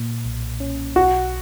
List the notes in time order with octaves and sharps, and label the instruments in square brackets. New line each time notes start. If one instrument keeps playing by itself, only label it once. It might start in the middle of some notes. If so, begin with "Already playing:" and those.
Already playing: [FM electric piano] A#2
B1
C#4
[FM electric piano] B1 [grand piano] F#4